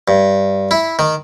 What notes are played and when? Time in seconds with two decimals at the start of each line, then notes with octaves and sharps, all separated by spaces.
0.08 G2
0.71 E4
0.99 D#3